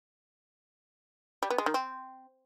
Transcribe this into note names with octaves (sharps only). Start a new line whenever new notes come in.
G3
B3
G#3
D#3
C4